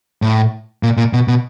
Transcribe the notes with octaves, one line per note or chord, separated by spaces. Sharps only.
A2
A#2
A#2
B2
B2